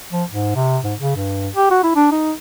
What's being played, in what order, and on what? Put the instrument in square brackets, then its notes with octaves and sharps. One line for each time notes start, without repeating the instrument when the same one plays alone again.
[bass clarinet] F3
G#2
C3
G#2
C#3
G2
G4
F#4
E4
D4
D#4